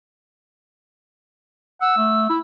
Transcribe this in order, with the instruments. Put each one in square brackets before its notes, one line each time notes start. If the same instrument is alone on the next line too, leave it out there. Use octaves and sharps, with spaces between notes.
[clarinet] F#5 [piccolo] E6
[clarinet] A3
E4